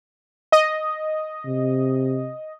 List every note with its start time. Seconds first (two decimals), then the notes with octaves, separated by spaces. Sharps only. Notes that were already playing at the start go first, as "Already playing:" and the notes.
0.52 D#5
1.45 C3